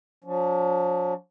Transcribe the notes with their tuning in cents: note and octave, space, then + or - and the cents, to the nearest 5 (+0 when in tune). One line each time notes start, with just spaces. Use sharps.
F3 +45 D4 -45